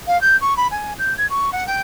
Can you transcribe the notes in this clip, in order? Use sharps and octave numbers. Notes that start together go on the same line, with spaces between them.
F5
G6
C#6
B5
G#5
G6
G#6
C#6
F#5
G5